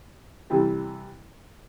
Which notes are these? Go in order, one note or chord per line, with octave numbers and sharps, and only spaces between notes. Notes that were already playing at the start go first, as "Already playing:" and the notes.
C3 E3 G3